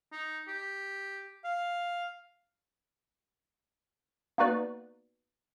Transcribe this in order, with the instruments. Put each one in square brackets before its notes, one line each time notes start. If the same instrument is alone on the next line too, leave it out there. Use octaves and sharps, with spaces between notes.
[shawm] D#4
G4
F5
[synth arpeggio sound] A#3 B3 D#4 F#4 B4 D5